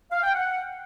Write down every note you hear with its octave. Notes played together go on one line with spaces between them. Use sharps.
F5
G5
F#5